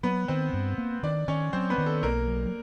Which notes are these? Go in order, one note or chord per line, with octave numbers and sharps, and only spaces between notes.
F#3 B3 B4
D#3 C4 C5
G2
A#3
D#3 D4 D5
D#3 C#4 C#5
F#3 C4 C5
B3 B4
D#3
A4
B1 A#3 A#4
F#3